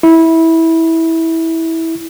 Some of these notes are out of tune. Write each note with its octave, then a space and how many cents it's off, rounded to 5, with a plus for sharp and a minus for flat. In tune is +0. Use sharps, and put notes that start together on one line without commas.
E4 -15